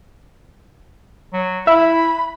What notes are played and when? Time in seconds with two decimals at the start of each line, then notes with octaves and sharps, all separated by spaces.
1.33 F#3
1.67 E4 E5 B5